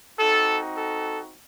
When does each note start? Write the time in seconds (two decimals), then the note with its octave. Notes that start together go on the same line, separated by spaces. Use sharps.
0.18 C4 D#4 F#4 A4
0.77 A4